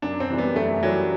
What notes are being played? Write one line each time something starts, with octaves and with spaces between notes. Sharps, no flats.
F#2 D4
C4
E3 G3 D4
B3
F#2 A3
E3 F#3 G3 D4